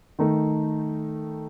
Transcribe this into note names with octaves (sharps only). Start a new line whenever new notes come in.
D#3 A3 D#4